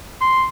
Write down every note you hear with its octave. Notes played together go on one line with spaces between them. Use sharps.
C6